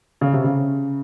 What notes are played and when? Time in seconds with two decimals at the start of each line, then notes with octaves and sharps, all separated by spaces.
0.21 C#3
0.33 C3
0.44 C#3